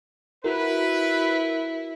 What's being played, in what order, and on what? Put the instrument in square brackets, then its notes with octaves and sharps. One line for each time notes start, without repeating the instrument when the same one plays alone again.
[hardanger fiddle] E4 [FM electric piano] F#4 A#4 [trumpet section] B4